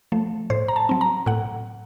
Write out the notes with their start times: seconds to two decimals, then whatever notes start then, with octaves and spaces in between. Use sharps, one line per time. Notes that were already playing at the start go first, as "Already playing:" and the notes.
0.12 F3 A3
0.50 A2 C5
0.68 A#5
0.76 A5
0.89 F#3 C4
1.01 A#5
1.26 A2 F#5